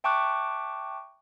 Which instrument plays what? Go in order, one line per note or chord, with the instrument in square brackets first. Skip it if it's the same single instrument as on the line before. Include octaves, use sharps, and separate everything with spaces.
[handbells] E5 G5 A5 C#6 D6 F#6